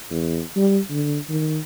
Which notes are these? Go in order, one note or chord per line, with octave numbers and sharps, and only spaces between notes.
E2
G3
D3
D#3